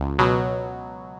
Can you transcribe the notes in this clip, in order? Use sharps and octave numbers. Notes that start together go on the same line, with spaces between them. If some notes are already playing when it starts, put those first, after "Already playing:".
Already playing: C#2
B2 F#3